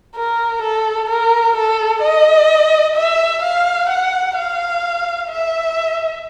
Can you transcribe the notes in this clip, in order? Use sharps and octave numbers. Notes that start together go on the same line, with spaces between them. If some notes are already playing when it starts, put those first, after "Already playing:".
A#4
A4
A#4
A4
D#5
E5
F5
F#5
F5
E5